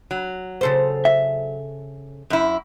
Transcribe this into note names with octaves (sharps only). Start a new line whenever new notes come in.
F#3
C#3 A4 C5
E5
F#2 E4